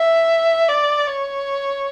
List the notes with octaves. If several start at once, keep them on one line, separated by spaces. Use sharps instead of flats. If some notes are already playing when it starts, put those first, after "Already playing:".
Already playing: E5
D5
C#5